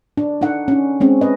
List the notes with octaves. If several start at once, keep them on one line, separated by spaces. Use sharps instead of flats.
D4
D4 D#4 A4 F#5
C#4 D#4
G#3 C4 C#4
B4 D#5